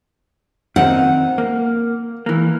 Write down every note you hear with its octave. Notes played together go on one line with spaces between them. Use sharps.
D#3 C4 D#4 F#5
A#3
E3 A#3